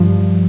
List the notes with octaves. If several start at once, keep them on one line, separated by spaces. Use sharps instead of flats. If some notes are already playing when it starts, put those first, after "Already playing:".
Already playing: G2 F3